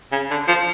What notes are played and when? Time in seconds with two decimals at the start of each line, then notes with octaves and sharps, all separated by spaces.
0.12 C#3
0.31 D3
0.48 F3